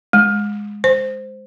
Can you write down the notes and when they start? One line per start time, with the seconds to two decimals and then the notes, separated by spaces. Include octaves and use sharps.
0.13 G#3
0.84 C5